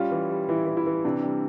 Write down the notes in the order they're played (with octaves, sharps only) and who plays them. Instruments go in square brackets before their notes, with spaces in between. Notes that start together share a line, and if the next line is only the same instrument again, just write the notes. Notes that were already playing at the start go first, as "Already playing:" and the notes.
Already playing: [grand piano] G3 C#4 [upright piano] F4
[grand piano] E3
G3
[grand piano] E3 [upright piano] E4
[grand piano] E3
[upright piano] E4
[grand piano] E3
[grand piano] C3 [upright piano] D4
[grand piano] G3